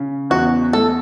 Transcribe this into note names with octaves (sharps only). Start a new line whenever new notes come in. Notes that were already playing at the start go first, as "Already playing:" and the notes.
Already playing: C#3
E2 F#4
A3 A4